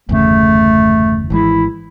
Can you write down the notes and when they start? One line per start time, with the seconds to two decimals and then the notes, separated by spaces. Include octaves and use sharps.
0.09 G1 E2 C#3 A3
1.30 G#1 E3 G#3 E4